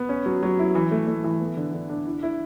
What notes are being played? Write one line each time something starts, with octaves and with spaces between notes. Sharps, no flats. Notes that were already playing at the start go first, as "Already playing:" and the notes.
Already playing: B3
C#4
F#3
F#3
E4
E3
A3
A3
E3
B3
D3
D3
D4
E4
E4